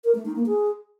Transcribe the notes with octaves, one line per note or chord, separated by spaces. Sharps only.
A#4
A3
D#4
A#3
G#4